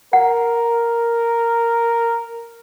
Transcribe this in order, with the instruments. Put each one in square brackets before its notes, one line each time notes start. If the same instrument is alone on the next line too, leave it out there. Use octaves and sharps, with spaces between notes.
[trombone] A#4 [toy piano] F#5